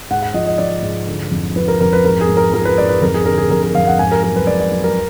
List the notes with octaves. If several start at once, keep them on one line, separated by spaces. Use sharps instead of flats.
G#2 F#5
F#5
F3 D#5
D#5
F3 D5
G#2
D3
F2
F3 B4
A#4
F2 A#4
B4
G#2 A#4
G#4
G#2
A#4
F3 A#4
B4
G#2 D5
B4
F2 A#4
G#4
D3 A#4
G#4
F2 A#4
A#4
F2 F5
F#5
G#2 G#5
A#4
F#3 A#4
B4
G#2 D5
D5
F#3
A#4